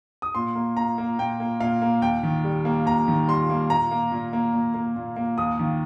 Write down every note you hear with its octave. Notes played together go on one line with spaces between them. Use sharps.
D#6
A#2 C6
A#3
A#2 A#5
A#3
A#2 G5
A#3
A#2 F5
A#3
D#2 G5
D#3
G3
A#3
D#2 A#5
D#3
G3 C6
A#3
A#2 A#5
A#3
A#2
A#3
A#2
A#3
A#2
A#3
D#2 D#6
D#3